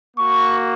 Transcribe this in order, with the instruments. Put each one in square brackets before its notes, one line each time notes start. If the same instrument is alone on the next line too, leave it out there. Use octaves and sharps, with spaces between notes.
[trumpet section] A#3 F#4 C#6